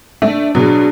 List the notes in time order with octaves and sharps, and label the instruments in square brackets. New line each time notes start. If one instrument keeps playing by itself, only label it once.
[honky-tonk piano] A3 [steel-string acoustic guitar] D4
[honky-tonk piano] B2 F#3 [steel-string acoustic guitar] D4 G#4